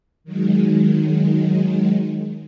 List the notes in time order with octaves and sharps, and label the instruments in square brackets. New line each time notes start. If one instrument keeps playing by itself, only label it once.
[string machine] D#3 F#3 G#3